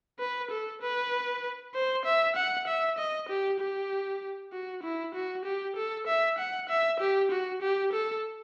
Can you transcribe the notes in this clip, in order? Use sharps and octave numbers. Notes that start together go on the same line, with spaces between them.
B4
A4
B4
C5
E5
F#5
E5
D#5
G4
G4
F#4
E4
F#4
G4
A4
E5
F#5
E5
G4
F#4
G4
A4